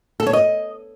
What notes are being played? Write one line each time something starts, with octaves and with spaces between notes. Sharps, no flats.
A4
C#5
D#5